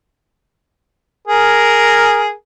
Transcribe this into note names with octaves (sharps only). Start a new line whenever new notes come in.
G#4 A#4